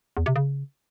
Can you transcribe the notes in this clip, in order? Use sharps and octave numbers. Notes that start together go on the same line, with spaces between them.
E2
C3
C#3